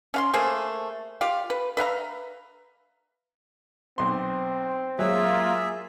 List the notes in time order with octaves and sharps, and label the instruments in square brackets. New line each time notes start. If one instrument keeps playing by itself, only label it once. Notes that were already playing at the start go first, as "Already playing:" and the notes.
[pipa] C#4 F5 C6
A3 A#3 G#4 C5
F4 G4 F5
B4
B4 E5 F5 A#5
[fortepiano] B1 C6 [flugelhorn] C4
[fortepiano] F#3 G#3 [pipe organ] A#3 F4 [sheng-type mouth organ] G#4 E5